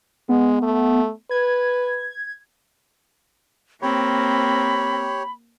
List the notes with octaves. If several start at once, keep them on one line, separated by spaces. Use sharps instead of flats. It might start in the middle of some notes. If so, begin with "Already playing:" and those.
G#3 B3
A3
B4 G#6
A#3 C4 G4 C#5 B5